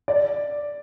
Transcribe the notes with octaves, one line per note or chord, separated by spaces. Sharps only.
D5